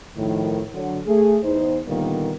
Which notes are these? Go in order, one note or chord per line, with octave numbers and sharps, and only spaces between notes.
A2 D#3 F3
D3 F#3
A3 G#4
E2 D#4 C5
A#2 D3 D#3 G3 A#3 B3